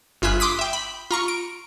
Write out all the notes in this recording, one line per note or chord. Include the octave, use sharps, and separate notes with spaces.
G1 F4 E5 G#5 B5 F#6
C6 D6 D#6 B6
E5 G5
B5
F4 A#5 C#6
D7